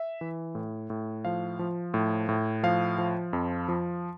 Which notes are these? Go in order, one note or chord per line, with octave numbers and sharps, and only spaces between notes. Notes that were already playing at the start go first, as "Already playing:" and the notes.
Already playing: E5
E3
A2
A2
F3 F5
F3
A2
A2
F3 F5
F3
F2
F3